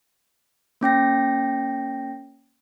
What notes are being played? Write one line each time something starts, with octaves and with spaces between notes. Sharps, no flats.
A#3 C#4 G5 A#6